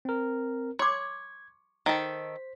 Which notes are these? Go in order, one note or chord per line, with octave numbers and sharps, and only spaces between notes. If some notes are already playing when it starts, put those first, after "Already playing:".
C4 A#4
C#5 C6 D6 G#6
D#3 A4 C5 B6